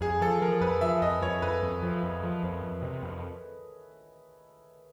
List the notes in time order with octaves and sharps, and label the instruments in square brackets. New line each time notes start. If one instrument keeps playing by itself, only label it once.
[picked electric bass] F2 [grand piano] G#4
[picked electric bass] F3 [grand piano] A4
[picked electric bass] F3 [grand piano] A#4
[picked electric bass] F2 [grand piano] B4
[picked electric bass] F3 [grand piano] E5
[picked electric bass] F2 [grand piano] D#5
[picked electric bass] F2 [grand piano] C#5
[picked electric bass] F2 [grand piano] B4
[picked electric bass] F2
F3
F2
F3
F2
F2
C3
F2